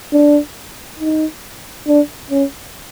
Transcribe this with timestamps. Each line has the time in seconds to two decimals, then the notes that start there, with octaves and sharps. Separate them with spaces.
0.13 D4
0.99 D#4
1.87 D4
2.31 C#4